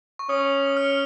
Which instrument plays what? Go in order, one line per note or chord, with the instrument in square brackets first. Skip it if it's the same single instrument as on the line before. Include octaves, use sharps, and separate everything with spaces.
[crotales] C#6
[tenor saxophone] C#4 [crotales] D#6
[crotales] D#6
F6